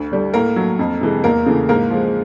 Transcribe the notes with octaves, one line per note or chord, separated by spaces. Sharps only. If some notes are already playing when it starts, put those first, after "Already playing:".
Already playing: D2
D3 G3
A2 A#3 A#4
F#3 A3
F2
C3 E3 G#3
E2 A#3 A#4
C#3 E3 A3
G#2 A#3 A#4
F3 G#3